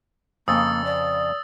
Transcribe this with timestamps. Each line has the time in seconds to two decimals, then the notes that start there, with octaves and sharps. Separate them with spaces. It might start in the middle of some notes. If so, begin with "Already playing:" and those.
0.48 F2 C#3 A#3 D#6 E6 A6
0.85 D5